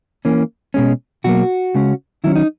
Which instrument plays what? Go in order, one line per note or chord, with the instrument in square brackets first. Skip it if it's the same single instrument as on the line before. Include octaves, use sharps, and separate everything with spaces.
[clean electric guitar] E3 A#3 C#4
B2 G#3 C#4
B2 F#3 A#3 F#4
C#3 G#3 C#4
D#3 F#3 A#3 C#4 E4
D#4